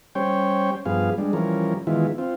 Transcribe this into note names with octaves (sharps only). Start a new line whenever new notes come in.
G3 C#4 C5 C#5 G5
G2 F3 B3 G#4 F5
G3 G#3 D4
E3 F3 G3 C#4 A#4
D#3 E3 G#3 B3 E4 F4
C4 F4